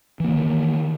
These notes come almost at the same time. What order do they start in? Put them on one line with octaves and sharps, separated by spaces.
E3 A#3 D#3